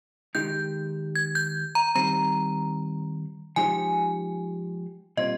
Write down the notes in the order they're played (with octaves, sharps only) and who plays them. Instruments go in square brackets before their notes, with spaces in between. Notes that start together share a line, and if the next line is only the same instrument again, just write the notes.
[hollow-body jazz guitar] D#3 G#3 D#4 G4 [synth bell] G6
[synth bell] G#6
G6
A#5
[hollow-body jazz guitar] D#3 G3 C4 [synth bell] A#5
[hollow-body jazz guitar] F3 G#3 D#4 G4 C5 [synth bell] G#5
[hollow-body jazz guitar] A#2 G3 C4 F4 C5 [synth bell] D#5